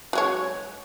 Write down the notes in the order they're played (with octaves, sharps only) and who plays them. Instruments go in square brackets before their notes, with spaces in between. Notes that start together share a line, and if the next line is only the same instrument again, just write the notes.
[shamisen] F#3 G#3 C#5